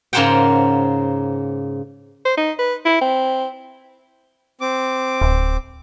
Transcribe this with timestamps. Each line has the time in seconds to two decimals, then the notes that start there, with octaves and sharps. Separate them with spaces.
0.13 G#2 C#3 A#3 C5 F#5 G5
2.25 C5
2.37 D#4
2.59 B4
2.85 E4
3.01 C4
4.61 C4 D6
5.22 D1